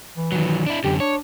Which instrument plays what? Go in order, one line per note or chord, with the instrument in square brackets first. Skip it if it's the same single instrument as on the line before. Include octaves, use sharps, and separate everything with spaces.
[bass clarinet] E3
[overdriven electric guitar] D#3 F#3
D4 E4
[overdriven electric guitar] F#2 D3 [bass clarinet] G4
[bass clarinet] D4 [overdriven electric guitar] C#5